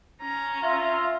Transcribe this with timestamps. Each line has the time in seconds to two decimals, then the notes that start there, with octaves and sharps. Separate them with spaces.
0.21 C#4 A#5
0.63 F4 E5